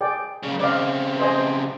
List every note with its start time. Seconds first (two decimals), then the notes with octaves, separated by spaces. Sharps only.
0.01 G#4 D5 G5
0.43 C#3 A#3
0.60 C#3 C4 D5 D#5 F5
1.20 C5 D#5 G#5